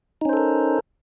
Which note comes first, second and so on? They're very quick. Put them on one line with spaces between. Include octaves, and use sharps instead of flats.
D#4 C#4 C5 A4 A#4